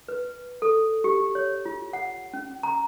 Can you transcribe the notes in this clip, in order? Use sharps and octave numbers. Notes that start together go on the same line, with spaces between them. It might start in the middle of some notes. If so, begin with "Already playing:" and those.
B4
A4
G4
C#5
F4
F#5
C#4
A#5